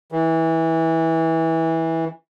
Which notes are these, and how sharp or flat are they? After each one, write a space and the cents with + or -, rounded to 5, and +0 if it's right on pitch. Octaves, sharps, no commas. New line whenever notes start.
E3 -20